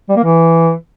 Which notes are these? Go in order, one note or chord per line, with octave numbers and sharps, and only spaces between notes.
G3
A#3
E3